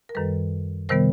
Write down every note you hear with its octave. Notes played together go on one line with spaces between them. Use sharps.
A#4
F#2 D#3 G3 A4 B4
C3 D#3 G3 B3 A#4 C5